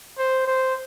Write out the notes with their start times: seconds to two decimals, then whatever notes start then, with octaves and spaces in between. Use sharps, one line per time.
0.18 C5
0.47 C5